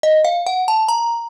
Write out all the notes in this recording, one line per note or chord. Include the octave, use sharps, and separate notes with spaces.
D#5
F5
F#5
A5
A#5